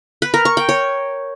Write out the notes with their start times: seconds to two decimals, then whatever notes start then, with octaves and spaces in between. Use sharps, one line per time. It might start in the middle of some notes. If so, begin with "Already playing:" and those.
0.22 B4
0.34 A#4
0.45 C#6
0.57 G5
0.69 C#5